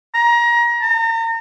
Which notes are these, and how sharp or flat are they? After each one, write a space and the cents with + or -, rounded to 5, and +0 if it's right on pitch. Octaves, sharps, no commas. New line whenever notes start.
A#5 +25
A#5 -40